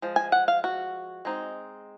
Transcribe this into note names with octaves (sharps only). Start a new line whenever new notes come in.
F3 G#3
G#5
F#5
F5
F#4
G#3 C4 D#4